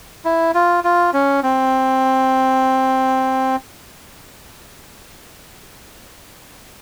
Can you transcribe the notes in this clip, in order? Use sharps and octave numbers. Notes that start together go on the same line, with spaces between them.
E4
F4
F4
C#4
C4